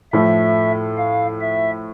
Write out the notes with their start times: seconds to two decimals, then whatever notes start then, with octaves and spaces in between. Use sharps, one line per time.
0.13 A2 F3 A3 E5
0.97 F5
1.41 E5